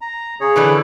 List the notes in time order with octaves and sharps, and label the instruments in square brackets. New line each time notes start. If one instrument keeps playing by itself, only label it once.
[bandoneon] A#5
C#3 G#4 C#5
[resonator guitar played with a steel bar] D3 E3 B4